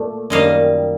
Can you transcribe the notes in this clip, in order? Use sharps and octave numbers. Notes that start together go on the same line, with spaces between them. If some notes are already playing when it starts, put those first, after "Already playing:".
Already playing: A#2 A3 D5
F#2 D#3 G3 A#3 D#5 F5